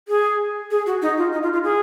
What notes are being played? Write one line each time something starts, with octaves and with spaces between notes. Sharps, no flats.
G#4
G#4
F#4
D#4
F4
D#4
F4
F4
G#4